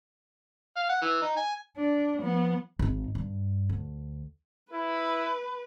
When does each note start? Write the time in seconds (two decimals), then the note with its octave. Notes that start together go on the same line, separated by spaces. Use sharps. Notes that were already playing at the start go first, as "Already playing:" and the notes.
0.76 F5
0.89 F#5
1.02 E3
1.22 D#4
1.37 G#5
1.77 D4
2.20 F3 B3
2.79 G#1 D#4
3.15 G2
3.69 D2
4.72 E4 B4